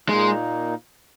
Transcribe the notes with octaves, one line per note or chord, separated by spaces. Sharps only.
A#2 G#3 A#3 D#4